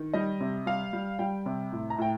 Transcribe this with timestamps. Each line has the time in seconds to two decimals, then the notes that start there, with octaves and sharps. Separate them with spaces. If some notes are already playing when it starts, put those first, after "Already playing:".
Already playing: D#3
0.14 G3 D#5
0.41 C3
0.66 G3 F5
0.93 G3
1.19 G3 G5
1.46 C3
1.72 A2
1.90 A#5
1.98 A2 G5